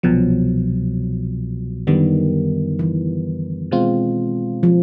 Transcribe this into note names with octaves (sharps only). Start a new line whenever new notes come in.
C2 B2 F3 F#3
F#2 D3 D#3 G3 B3
E3
B2 G#3 C4 F4
F3